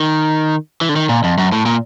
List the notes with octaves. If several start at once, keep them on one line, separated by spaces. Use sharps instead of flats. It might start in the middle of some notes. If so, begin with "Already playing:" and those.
Already playing: D#3
E3
D3
D#3
A#2
F2
F#2
A2
A#2